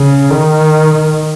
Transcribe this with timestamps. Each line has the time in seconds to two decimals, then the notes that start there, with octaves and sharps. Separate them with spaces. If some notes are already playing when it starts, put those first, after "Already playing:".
Already playing: C#3
0.31 D#3